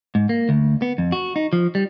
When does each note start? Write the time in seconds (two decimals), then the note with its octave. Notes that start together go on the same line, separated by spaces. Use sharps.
0.15 G#2
0.29 A#3
0.49 D2
0.82 B3
0.98 F2
1.12 F#4
1.36 D#4
1.53 F3
1.75 G3